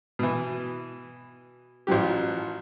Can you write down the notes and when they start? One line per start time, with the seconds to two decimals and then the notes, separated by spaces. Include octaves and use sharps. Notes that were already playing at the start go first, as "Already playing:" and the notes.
0.19 B2 E3
1.87 A1 F3 F#3 G4